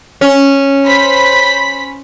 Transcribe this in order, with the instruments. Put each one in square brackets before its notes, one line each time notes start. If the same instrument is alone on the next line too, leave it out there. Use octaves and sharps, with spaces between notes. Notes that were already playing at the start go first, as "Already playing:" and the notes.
[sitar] C#4
[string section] C5 B5 B6